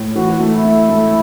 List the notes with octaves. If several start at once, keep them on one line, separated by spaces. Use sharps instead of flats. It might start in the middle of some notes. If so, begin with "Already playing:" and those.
Already playing: A2
E3 F#4
A3
E4
A3
A3